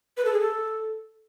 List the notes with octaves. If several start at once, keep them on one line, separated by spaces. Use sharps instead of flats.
B4
A4
G#4
A4